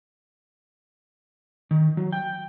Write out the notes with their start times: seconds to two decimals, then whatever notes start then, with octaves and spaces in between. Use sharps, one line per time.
1.71 D#3
1.97 F#3
2.12 G5